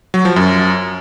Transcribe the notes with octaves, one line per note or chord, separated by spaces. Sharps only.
F#3
F3
F#2